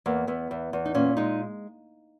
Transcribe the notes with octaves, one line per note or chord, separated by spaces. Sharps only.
E2 A#3
E2 B3
E2
E2
D#4
A#2 C#4
G#3 D#4